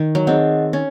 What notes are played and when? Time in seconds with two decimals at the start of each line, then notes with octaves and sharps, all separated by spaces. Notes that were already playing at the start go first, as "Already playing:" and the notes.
Already playing: D#3
0.15 F#3
0.27 C4 D#4 G#4 D#5 F#5
0.73 C#4